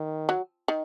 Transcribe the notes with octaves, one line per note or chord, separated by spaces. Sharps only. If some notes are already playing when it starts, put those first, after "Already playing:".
Already playing: D#3
F#3
D#3